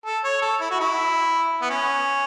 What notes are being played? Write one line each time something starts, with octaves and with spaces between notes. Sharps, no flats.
A4
C#5
A4
E4
F#4
E4
B3
C#4